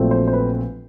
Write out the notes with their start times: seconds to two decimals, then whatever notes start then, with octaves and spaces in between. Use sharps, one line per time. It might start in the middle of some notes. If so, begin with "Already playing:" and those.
Already playing: A#1 A#2 F#3 A3 C4
0.11 C5
0.28 C5
0.33 B4